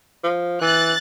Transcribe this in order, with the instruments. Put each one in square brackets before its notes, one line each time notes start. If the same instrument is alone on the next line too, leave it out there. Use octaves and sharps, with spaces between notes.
[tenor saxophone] F3
[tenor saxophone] E3 [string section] F#6 A6